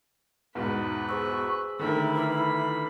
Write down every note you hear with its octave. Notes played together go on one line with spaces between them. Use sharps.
E2 G#2 B2 D#4 B4
G#4 C5 C#6 E6
D3 D#3 A3 E4 A#4 B5
B4 B5 D6 F6